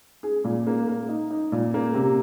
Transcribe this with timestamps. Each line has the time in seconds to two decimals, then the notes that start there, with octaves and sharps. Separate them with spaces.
0.23 G#4
0.44 A#2
0.67 A#3
0.88 A#3
1.09 D#4
1.30 D#4
1.52 A#2
1.74 A#3
1.94 C3